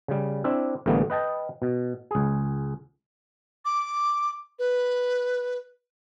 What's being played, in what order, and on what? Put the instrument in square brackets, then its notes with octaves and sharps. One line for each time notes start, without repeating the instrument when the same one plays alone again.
[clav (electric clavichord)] C#3 G3
C4 D4 E4 E5
A1 A2 D3 G3 A#3 B3
B4 D#5 G5 A5
B2
C#2 G#4
[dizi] D6
B4